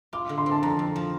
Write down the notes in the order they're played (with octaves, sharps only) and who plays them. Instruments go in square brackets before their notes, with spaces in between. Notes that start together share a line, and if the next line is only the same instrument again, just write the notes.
[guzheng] F4 [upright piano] D6
[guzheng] D3
[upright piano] C6
[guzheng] C4
[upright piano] A5
[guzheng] F2 [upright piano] A#5
[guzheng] F2
F3